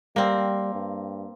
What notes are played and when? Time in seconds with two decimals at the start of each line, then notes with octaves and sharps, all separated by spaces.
0.16 G3 A#3 C4
0.74 G2